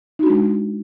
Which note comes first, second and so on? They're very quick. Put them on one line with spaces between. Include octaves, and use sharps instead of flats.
D#4 F#4 D4 G#3